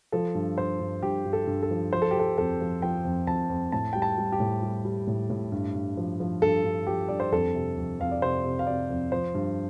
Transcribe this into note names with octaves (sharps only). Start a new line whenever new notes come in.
F3 A4
G2
G2 C5
G2
G2 G4
G2
A4
G2
A4
F3
F3 C5
A4
G4
F3 A4
F2 A4
F3
F3 G5
F2
F2 A5
F2
A2 A5
G3 G5
A5
G3
G4
A2
G3
G3
A2
A2
G2
G2
F3
F3
G2 A4
G2
F3 G4
G2 D5
C5
F2 A4
C3
F2
F2 F5
D5
C3 C5
C3
F5
C3 D5
F2
F3 C5
G2